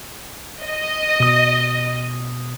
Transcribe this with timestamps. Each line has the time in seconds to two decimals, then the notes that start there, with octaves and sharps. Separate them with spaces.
0.63 D#5
1.20 B2 D#6